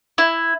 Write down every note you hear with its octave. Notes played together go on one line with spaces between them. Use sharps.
E4